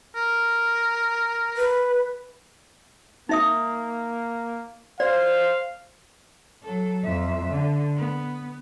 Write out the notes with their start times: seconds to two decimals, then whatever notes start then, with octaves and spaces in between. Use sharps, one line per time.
0.15 A#4
1.57 B4
3.29 A#3 D#4 E5 D#6
5.00 C5 D5 F5
6.63 F#3 A4
7.04 F2 E5
7.50 D3
7.96 B3